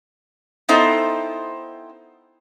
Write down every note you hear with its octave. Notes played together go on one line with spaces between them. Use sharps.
B3 C4 D#4 E4 A4 C5